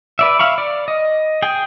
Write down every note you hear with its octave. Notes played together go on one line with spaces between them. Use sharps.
B4 D5 E5
E5 F5 B5 C#6
D5
D#5
G#4 G5